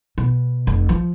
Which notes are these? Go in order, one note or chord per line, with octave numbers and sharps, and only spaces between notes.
B2
F1
F3